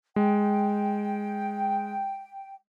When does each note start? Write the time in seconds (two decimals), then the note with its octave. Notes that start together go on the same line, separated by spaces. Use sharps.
0.16 G#3 G5